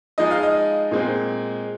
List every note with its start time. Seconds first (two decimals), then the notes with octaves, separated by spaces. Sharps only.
0.18 F3 G#3 D#4 D#5
0.31 F5
0.43 D#5
0.91 A#2 G#3 C4